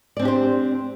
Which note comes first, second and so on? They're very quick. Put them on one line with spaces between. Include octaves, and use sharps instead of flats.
D5 C4 D4 G4 C5